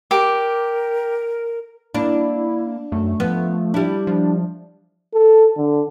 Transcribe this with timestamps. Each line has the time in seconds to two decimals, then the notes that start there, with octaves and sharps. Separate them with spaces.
0.11 G4 A#4 D6
1.94 A#3 D4 E4
2.92 F#2 A3
3.20 F3 B3
3.74 G3 D4 E4
4.07 F3
5.14 A4
5.57 D3